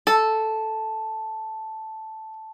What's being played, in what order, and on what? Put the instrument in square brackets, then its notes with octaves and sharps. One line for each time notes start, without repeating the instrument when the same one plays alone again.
[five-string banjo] A4 [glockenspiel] A5